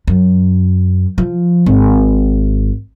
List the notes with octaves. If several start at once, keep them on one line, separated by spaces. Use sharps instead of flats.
F#2
F3
G#1